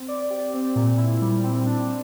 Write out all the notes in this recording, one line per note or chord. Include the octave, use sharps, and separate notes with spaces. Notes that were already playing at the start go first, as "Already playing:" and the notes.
Already playing: C4
D5
G4
C4
A#2
E4
G3
C4
D4